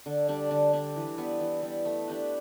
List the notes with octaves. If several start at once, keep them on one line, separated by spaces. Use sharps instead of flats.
D3
G3 D4
D3
G3 D4
E3
G3 B3
E3
G3 B3
A3
D4 G4 B4